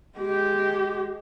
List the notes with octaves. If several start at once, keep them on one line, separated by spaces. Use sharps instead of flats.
G#3 G4